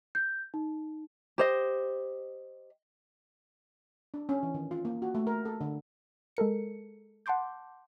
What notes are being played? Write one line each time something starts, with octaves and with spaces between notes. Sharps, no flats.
G6
D#4
G4 C5 D#5
D4
C#4
E3
D#3
F4
A#3
F#4
A3
A#4
A4
D3
G#3 A4 A#4 C#7
F#5 A5 C6 D6 G6